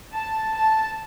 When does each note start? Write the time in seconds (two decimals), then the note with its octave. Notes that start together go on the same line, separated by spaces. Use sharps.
0.13 A5
0.55 A5